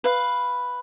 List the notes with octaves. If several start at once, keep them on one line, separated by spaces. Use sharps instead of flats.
B4 F5